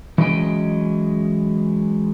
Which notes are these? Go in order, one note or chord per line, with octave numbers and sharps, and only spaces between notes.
E3 F#3 G#3 C#4 D#5 G5